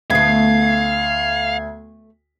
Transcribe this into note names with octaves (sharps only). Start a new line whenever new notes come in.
D2 A3 B3 F5 G#6 C7